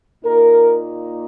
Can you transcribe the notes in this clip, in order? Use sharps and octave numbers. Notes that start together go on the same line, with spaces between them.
A#2 A#3 D#4 A#4